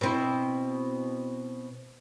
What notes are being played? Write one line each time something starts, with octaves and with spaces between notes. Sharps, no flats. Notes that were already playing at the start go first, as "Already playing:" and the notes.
B2 C4 E4